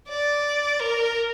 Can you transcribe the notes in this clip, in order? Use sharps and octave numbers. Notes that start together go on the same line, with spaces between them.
D5
A#4